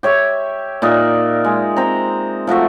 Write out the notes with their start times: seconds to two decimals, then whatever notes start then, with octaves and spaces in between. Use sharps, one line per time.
0.03 G4 C#5 E5
0.82 A#2 D#4 D5 E5
1.45 G#3
1.76 C4 A#5
2.47 F3 A3 F#4 E5